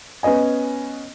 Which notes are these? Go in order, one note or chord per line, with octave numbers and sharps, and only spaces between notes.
B3 C#4 B4 D#5 G#5